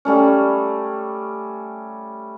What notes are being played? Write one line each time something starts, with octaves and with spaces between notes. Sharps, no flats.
G3 A3 C#4